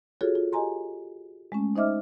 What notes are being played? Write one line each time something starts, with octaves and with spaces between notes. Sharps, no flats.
F4 F#4 G#4 A4 C#5
F4
G4 D#5 G#5 A#5 C6
G#3 A3 C#4
D#4 C5 D#5 E5 D6 F6